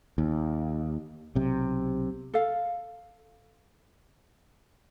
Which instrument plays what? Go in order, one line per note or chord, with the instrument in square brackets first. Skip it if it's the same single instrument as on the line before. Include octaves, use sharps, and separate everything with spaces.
[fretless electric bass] D#2
B1 C3
[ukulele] A4 F5